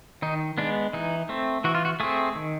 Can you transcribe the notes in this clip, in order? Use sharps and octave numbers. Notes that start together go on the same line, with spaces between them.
D#3 D#4
G#3 B3 D4
E3 D#4
A3 C4
E3 F#4
F4
F#4
A3 C4 G#4
D#3